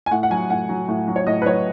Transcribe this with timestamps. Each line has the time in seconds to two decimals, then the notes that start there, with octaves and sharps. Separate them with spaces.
0.06 G#5
0.11 A2 F#5
0.23 F#5
0.30 F#3 G#5
0.50 A2 F#5
0.69 F#3
0.88 A2
1.08 F#3
1.16 C#5
1.27 A2 D#5
1.42 B4
1.45 F#3 C#5